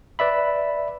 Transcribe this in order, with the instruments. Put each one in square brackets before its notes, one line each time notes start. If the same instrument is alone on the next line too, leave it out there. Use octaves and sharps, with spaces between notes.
[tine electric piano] B4 D5 E5 B5